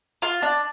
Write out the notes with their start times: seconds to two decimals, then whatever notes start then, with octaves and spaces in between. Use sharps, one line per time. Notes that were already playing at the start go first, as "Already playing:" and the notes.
0.22 F4
0.42 D4